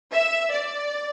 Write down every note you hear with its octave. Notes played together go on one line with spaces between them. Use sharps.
E5
D5